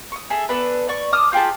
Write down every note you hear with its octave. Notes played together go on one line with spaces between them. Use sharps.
C#6 D#6
G#4 A4 E5
B3 D4 A4 B4
D5 C#6
A5 D6 D#6 F6
F4 G4 G#4 A5